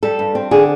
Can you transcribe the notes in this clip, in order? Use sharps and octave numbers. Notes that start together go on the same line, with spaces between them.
G3 A4
G2
C4
D3 G#4